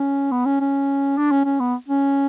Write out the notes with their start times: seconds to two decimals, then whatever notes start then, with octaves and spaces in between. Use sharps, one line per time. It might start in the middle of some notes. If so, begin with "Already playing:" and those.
Already playing: C#4
0.32 B3
0.45 C#4
0.60 C#4
1.17 D4
1.31 C#4
1.45 C#4
1.60 B3
1.88 C#4